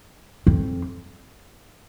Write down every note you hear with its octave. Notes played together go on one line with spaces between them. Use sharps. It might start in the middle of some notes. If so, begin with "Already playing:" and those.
F2